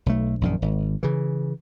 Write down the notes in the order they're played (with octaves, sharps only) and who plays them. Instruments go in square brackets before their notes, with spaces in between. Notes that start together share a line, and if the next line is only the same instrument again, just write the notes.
[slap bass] B1 A3
A#1 F#2 D#3
G#1
C#3 E3